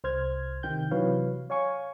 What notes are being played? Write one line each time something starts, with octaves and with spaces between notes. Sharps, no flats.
C2 C5 F6 G#6
C3 D#3 G5 G6
C3 E3 F#3 B4 C#5 F5
C#5 F5 G#5 C#6